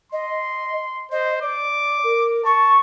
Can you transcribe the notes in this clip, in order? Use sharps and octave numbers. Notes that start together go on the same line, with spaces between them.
D#5 C6
C5 D#5
D5 D6
A#4
A5 C#6